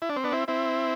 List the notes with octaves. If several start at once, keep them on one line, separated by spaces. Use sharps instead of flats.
E4
D4
C4
B3 D4
C4 E4
C4 E4